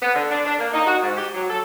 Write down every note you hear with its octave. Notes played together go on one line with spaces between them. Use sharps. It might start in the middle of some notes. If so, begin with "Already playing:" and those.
B3
D3
D4
D4
A#3
D#4
F#4
G#2
G4
F#3
A4